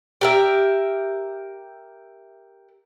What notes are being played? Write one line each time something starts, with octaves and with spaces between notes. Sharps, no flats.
G4 A#4 E5